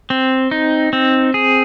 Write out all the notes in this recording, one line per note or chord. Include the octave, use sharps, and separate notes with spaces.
C4
D#4
C4
G#4